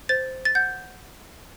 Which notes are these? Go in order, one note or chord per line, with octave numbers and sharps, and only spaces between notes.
C5 A6
A6
F#5 G6